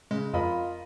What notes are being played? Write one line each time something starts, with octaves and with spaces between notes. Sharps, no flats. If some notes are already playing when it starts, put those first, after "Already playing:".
C#3 G#3
F2 F4 A#4 D#5 B5